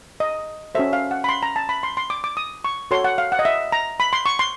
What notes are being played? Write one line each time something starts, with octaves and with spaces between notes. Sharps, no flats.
D#5
C#4 F#4 A4 C5 E5
F5
F#5
B5
C6
A#5
A5
B5
C6
C6
D6
D6
D#6
C#6
F#4 A4 C#5 C6
F#5
F5
F#5
D#5
E5
A#5
B5
C6
C#6
C6